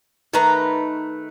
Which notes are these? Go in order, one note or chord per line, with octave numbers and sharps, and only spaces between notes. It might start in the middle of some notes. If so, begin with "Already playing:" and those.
D#3 A3 B4 A#5